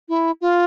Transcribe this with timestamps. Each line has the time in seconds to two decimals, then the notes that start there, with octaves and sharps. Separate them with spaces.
0.09 E4
0.41 F4